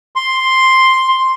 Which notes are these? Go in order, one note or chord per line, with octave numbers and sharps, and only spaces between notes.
C6